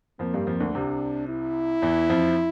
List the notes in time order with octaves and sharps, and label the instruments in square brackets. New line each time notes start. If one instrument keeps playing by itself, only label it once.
[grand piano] F2 F3 [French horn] A#3
[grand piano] G2 G3
F2 F3
D2 D3
[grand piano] C2 C3 [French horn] D4
[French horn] E4
[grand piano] E2 E3
F2 F3